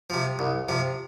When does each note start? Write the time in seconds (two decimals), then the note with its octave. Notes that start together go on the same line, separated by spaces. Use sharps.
0.10 C3 F3
0.39 C2
0.69 C3 F3